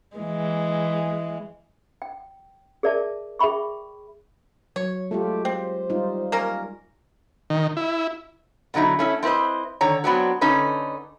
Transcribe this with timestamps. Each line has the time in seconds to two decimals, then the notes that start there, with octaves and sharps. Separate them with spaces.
0.16 E3 G#3
2.02 G5
2.83 G#4 A#4 D5 E5 A5
3.39 G#4 E5 G5 B5 C#6
4.76 F#3 C#5
5.11 G#3 A3 F4 G4
5.45 C4 C5
5.90 G3 D#4 F4
6.32 A#3 C#4 A#4
7.50 D#3
7.77 E4
8.74 B2 D3 F#3 D#4 E4
8.99 A3 C#4 E4
9.23 C4 E4 B4 C5 D#5
9.81 D3 D#3 C#5 A#5
10.04 F#3 B3 C4 D4 F#4
10.41 D3 C#4 D#4 A4 B4